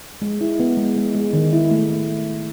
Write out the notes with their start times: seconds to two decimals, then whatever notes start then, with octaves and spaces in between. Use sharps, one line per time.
0.22 G#3
0.41 E4
0.59 B3
0.77 G#3
0.97 G#3
1.15 G#3
1.33 D#3
1.53 E4
1.71 A3
1.90 A3